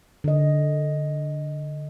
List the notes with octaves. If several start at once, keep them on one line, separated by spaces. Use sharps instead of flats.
D3 D#5